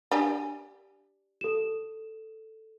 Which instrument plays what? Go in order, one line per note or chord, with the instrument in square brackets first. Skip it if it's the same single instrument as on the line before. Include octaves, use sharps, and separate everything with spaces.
[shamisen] D4 G4 G#5
[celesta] A4 E7